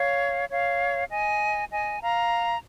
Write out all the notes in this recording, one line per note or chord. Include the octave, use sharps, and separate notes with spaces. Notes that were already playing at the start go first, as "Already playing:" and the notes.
Already playing: C#5 F5
C#5 F5
D#5 G#5
D#5 G#5
F5 A#5